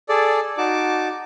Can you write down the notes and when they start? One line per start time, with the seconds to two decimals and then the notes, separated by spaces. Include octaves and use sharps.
0.09 G#4 A4 D5
0.58 D#4 F#4 A5 D6